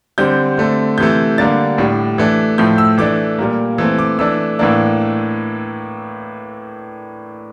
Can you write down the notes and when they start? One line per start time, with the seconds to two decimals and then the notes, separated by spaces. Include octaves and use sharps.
0.18 D3 G3 C4 G6
0.58 D3 A3 C4
0.98 C3 E3 A3 G6
1.38 D3 G3 A#3 D4 A6
1.78 A2 G3 D4
2.18 E3 A3 D4
2.58 A2 F3 A3 G6
2.78 E6
2.98 E3 A3 D4 D6
3.39 A#2 G3 A#3
3.78 E3 A3 C4
3.99 D6
4.18 E3 A3 D4 E6
4.59 A2 E3 A#3 D4